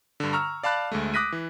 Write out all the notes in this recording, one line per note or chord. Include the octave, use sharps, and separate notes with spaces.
G2 D3
A#5 C#6 E6 F6
D5 F5 A5 B5 F#6
D2 G#3 A3
D6 D#6 F#6 A#6 B6 D#7
E3